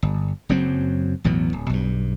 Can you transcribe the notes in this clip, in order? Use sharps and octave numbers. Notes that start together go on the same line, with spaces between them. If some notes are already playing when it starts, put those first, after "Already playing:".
G1
F#1 F#2 F#3 C4
A1 E2 B2 F#3
D1
B1 G2